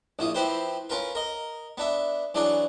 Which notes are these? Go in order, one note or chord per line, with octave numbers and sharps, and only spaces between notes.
A#1 E4 F4 D#6
F3 C4 E4 G4 B4 C5
C#4 F4 A#4 B4
A#4 D#5
B3 D4 E5
E3 F#3 D4 G#4 D5 C#6